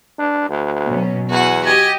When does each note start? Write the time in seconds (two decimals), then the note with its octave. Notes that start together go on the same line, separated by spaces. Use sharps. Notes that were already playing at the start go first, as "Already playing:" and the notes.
0.19 D4
0.49 D2
0.88 B2 F#3 C#4
1.30 E2 F#4 F#5 G#5
1.66 G4 D#5 G#5